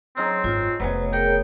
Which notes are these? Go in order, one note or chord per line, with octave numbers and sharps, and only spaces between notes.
F#3 C4 C#4 D#4 G#4 A#5 C6
G#1 F#2 F4
F1 F#3 B3 E4 B4 C5 G#5
G#4 A#4 C#5 G5